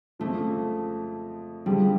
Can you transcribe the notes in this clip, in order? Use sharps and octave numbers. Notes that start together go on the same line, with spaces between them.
F2 C#3 F3 A3
F2 D3 F3 G3 G#3